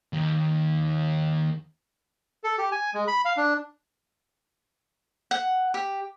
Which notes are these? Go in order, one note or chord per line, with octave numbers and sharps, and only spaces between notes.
D#2
A4
G4
G#5
G#3
B5
F5
D4
F#5
G4